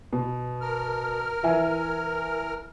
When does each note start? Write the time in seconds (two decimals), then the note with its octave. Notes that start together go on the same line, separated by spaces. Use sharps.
0.13 B2
0.61 A#4 F6
1.43 E3 E5 G#5